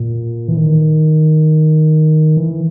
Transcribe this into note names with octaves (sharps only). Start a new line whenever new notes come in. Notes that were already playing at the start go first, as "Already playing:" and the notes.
Already playing: A#2
E3
D#3
E3